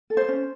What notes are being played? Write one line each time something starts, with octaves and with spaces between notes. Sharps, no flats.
A4
C5
C#4